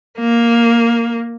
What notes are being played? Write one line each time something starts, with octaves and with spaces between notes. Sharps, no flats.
A#3